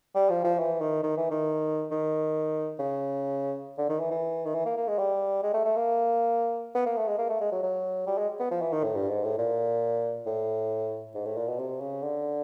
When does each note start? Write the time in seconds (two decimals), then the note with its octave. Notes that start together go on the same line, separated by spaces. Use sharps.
0.15 G3
0.30 F3
0.44 F3
0.59 E3
0.81 D#3
1.03 D#3
1.17 E3
1.31 D#3
1.91 D#3
2.79 C#3
3.78 D3
3.89 D#3
4.00 E3
4.11 E3
4.46 D#3
4.55 E3
4.66 A#3
4.77 A#3
4.88 G#3
4.99 G3
5.43 G#3
5.54 A3
5.65 A3
5.76 A#3
6.75 B3
6.86 A#3
6.97 A3
7.08 G#3
7.18 A#3
7.30 A3
7.41 G#3
7.52 F#3
7.63 F#3
8.07 G3
8.18 G#3
8.40 B3
8.51 F3
8.62 E3
8.73 D#3
8.84 A2
8.95 G2
9.09 G#2
9.24 A2
9.38 A#2
10.26 A2
11.15 G#2
11.25 A2
11.37 A#2
11.47 B2
11.59 C3
11.80 C#3
12.02 D3